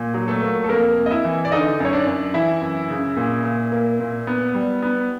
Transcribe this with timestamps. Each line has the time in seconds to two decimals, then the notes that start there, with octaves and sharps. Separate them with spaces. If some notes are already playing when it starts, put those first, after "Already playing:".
Already playing: A#2
0.14 F#3
0.28 A3 A4
0.42 A#3
0.64 A4
0.69 F2 A#3 A#4
0.96 C3
1.06 D#5
1.11 E4 E5
1.25 E3
1.45 D5
1.52 D3 D#4 D#5
1.80 F#2 C#5
1.93 D4 D5
2.07 F#2
2.34 E3 E4 E5
2.61 F#2
2.90 C#3
3.17 A#2
3.44 A#2
3.72 A#3
4.00 A#2
4.27 B3
4.54 G3
4.82 B3